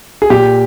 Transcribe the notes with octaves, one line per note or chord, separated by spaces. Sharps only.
G#4
A#2 G4